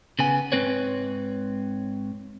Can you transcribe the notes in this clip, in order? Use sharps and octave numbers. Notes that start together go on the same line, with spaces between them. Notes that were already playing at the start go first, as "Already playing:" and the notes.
C#3 B3 G#5
G#2 G#3 C4 B4 C#5